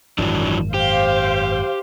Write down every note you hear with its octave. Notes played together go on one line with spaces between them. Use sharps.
G#1 F#2 E3 F#3 D4
G4 C5 F5